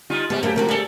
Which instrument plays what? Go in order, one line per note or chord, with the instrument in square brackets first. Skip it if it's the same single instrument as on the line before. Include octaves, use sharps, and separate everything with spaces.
[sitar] G3 D#4 F4
[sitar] G3 G#3 [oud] B3
[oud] F#2 A3 A#3 [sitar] G4 A4
[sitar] C3 F3 A#3 [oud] F#4 G4 A#4
[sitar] G3 A4 [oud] G#4 D5